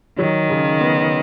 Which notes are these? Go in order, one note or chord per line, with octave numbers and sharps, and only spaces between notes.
D#3 F#3
C#3
B3